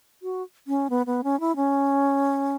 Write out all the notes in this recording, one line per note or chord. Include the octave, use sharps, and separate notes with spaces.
F#4
C#4
B3
B3
C#4
E4
C#4